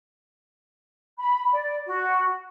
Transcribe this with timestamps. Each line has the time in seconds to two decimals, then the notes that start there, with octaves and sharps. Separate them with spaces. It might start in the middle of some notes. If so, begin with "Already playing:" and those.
1.18 B5
1.53 D5
1.86 F#4